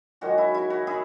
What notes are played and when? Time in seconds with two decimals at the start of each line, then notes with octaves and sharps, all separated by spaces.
0.21 F#2 D#3 G#3 C#4 F#4
0.38 E4
0.54 E4
0.70 F#4
0.87 E4 G#4